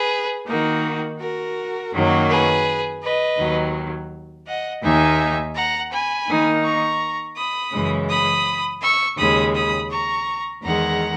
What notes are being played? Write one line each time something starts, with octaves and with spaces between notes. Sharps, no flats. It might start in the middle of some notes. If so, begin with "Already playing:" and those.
Already playing: G#4 B4
D#3 A#3 D#4 F#4 A#4
F#4 A#4
F#2 D#3 F#3 A#3
G#4 B4
B4 D#5
D#2 D#3 F#3
D#5 F#5
D#2 D#3 A#3 D#4 E5 G#5
F#5 A#5
G#5 B5
D#3 A#3 D#4
A#5 C#6
B5 D#6
F#2 C#3 E3 G#3
B5 D#6
C#6 E6
D#2 C#3 G#3 B5 D#6
B5 D#6
A#5 C#6
E2 D#3 G#3 F#5 A#5